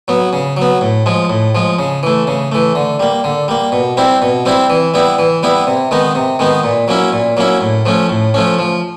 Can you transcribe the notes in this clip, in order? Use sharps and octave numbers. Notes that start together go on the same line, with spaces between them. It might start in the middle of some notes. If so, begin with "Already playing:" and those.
F#3 B3
C#3
F#3 B3
A2
F3 G#3
A2
F3 G#3
C#3
E3 A3
C#3
E3 A3
D3
G3 A#3
D3
G3 A#3
B2
G3 C4 E4
B2
G3 C4 E4
E3
G3 B3 E4
E3
G3 B3 E4
C3
D#3 G#3 B3 D#4
C3
D#3 G#3 B3 D#4
A#2
F#3 A#3 C#4 E4
A#2
F#3 A#3 C#4 E4
A2
F3 A3 C#4
A2
F3 A3 C#4
F3